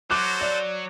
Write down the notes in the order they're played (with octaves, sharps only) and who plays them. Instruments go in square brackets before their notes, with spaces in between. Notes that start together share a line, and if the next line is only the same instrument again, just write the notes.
[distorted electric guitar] F#3 [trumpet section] F#4 A4 C5 [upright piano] D6 F#6
[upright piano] D5